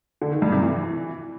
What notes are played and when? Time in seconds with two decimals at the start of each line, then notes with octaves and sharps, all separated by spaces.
0.21 D3
0.32 D#3
0.42 G2
0.52 C3
0.63 E3